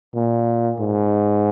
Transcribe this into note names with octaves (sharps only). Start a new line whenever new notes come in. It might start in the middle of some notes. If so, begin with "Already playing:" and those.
A#2
G#2